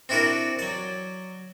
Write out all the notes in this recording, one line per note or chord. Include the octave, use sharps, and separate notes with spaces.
C4 D4 E4 F#4 A#4 D5
F#3 D5